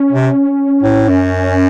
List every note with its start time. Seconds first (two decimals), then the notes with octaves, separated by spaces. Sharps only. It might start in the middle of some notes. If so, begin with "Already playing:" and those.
Already playing: C#4
0.12 C3
0.83 A2
1.08 F#2 C#4